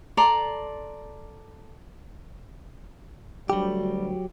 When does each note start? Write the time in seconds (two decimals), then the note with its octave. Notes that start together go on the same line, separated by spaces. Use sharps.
0.17 A4 D5 A#5 C6
3.50 D2 F#3 G3 G4